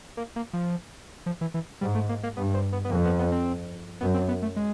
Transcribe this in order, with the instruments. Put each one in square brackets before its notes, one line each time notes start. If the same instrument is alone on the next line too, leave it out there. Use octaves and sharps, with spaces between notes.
[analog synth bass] A#3
A#3
F3
F3
E3
E3
[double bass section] G#2 [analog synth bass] G3
[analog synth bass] A3
A#3
A#3
[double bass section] G2 [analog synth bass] B3
[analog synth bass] C4
B3
B3
[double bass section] F2 [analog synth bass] A#3
[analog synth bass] B3
B3
C4
[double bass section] F#2 [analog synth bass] B3
[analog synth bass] C4
B3
A3
G#3